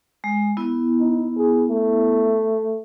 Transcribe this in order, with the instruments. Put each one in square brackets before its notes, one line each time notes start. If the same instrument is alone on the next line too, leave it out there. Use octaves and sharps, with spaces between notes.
[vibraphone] G#3
B3 E4
[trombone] D#4
G#4
A3